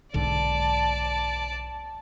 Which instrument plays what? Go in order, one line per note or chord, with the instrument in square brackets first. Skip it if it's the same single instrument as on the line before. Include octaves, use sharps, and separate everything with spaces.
[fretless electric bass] B1 G#2 D3 [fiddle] D5 A5